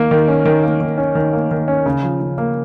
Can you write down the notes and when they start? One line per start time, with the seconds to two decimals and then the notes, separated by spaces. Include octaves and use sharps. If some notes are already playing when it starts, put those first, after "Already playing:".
Already playing: D#3 A#3
0.11 D#3
0.28 C#4
0.45 D#3
0.63 A#3
0.81 D#3
0.98 C#4
1.15 D#3
1.33 A#3
1.51 D#3
1.68 C#4
1.86 C#3
2.03 F3
2.21 C#3
2.38 A#3